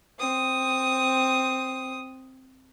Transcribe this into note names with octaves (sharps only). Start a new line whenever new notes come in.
C4 D#6